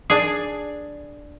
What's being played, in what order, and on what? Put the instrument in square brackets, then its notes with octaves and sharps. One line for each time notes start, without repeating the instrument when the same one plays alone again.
[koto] D4 G#4